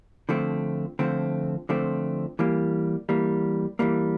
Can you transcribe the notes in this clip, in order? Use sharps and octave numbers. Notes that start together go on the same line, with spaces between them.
D3 F3 A3 C4
D3 F3 A3 C4
D3 F3 A3 C4
E3 G3 A#3
E3 G3 A#3
E3 G3 A#3